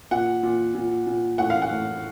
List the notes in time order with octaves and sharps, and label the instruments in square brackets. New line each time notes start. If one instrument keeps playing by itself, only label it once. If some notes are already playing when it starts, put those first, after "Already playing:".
[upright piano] A#2 F#5
A#2
A#2
A#2
A2 F#5
F5
F#5
A2